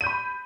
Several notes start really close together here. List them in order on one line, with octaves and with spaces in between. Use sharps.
D#7 G6 B5